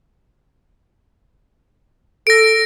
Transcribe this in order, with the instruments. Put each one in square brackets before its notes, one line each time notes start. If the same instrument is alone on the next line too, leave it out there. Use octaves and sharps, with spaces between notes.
[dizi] A4 [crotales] A#6 D7